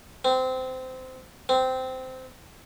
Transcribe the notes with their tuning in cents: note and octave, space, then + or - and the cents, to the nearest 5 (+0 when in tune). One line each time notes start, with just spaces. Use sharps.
C4 -20
C4 -15